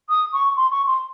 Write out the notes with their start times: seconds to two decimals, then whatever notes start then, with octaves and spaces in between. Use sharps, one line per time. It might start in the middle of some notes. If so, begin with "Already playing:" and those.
0.09 D#6
0.33 C#6
0.56 C6
0.71 C#6
0.87 C6